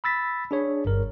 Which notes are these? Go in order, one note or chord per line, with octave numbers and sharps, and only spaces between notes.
B5 E6 A6 B6
D4 G#4 C#5
G1 G2 A#4